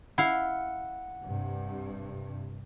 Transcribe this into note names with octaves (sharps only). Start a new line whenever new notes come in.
E4 F5 F#5
G2 C3